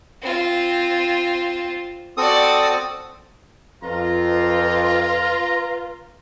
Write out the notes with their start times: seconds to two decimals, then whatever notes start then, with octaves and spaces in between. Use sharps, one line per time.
0.22 C4 F4
2.17 C4 F#4 A4 D5 D#6
3.83 F2 F4 B4 A#5